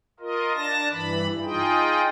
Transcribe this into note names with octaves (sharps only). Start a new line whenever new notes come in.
F4 A#4 D#5
D4 A5 A#6
G2 E3 B5
D#4 F4 G#4 D#5 G5